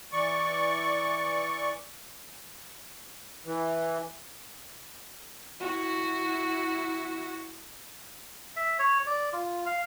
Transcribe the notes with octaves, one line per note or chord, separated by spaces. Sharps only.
E3 D5 C#6
E3
E4 F#4
E5
C#5
D5
F4
F5